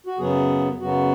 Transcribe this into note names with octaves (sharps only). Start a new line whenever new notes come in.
F#4
F#2 C#3 F#3 B3 G#4
F#2 C#3 F#3 B3 F#4